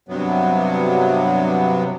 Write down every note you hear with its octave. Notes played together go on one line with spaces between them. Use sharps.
G2 C3 F#3 B3